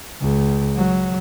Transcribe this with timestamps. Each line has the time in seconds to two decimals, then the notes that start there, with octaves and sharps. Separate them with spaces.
0.21 C#2
0.76 F#3